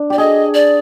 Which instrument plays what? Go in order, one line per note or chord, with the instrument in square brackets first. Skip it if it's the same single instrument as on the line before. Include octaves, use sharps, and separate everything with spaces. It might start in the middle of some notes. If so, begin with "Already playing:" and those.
Already playing: [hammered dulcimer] D4
[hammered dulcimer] G4 [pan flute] D5
[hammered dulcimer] G#4 [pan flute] D#5
[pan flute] D5